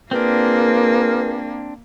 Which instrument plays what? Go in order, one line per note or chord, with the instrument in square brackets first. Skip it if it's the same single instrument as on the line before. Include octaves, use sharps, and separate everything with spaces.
[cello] A#3 [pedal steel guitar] C4 D4 [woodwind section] F4 G#4 A#4 [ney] B4